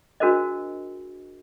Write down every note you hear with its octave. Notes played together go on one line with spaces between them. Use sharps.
D4 F#4 G#4 A#4 C5 D#5